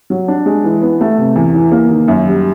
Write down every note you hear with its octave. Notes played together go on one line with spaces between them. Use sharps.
F#3
D4
G#3
E3
B3
A3
C3
E2
E3
A#3
D#3
F#2
G3